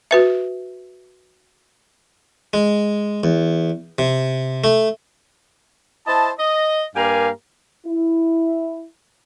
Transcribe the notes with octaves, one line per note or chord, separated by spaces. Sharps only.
F#4 B4 E5
G#3
E2
C3
A3
E4 C5 D#5 A5
D#5
G2 A#3 G4 A#4 F5 G#5
E4